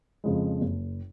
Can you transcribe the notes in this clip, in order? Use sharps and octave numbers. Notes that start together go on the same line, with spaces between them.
F2 C#3 F3 G#3
F#1